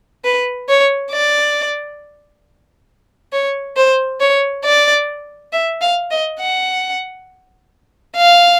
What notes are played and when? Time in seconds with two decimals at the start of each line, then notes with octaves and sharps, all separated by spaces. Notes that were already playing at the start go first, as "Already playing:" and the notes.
0.24 B4
0.69 C#5
1.12 D5
3.33 C#5
3.76 C5
4.20 C#5
4.64 D5
5.53 E5
5.81 F5
6.11 D#5
6.40 F#5
8.16 F5